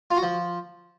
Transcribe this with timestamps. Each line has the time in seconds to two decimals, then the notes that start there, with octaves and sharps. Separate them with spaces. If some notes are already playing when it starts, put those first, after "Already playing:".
0.11 F4
0.17 F#4
0.23 F3